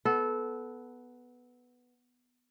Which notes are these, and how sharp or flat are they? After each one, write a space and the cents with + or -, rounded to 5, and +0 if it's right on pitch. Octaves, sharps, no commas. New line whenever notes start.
B3 +0 A4 -20